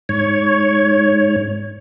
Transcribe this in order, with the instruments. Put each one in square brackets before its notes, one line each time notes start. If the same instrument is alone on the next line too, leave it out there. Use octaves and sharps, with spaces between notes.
[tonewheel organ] G#2 C#5